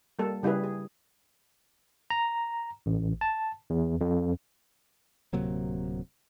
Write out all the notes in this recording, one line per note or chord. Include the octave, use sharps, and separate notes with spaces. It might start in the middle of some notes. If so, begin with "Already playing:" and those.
G3 A#3 A4
C#3 G3 E4 G#4 B4
G#4
A#5
A1
A5
E2
F2
D1 C3 F#3 A#3